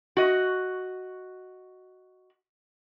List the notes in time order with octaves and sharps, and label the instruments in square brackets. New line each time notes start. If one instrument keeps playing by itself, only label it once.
[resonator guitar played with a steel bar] F#4 D#5